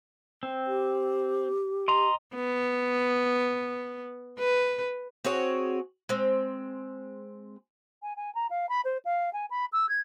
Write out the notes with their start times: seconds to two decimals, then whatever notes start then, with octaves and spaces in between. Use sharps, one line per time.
0.43 C4
0.67 G4
1.88 D#5 A#5 C6
2.35 B3
4.39 B4
5.24 C4 F#4 G#4 C#5
6.09 G#3 C4
8.03 G#5
8.16 G#5
8.35 A#5
8.50 F5
8.69 B5
8.85 C5
9.05 F5
9.33 G#5
9.51 B5
9.73 E6
9.89 G#6